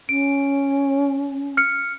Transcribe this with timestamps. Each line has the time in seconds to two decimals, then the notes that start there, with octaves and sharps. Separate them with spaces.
0.09 C#4 D7
1.57 F6 C#7